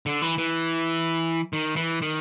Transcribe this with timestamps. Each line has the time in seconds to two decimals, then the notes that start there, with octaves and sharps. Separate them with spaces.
0.06 D3
0.22 E3
0.38 E3
1.53 D#3
1.76 E3
2.02 D#3